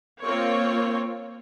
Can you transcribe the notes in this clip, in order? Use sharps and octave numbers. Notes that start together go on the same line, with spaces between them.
A#3 C4 F4 C#5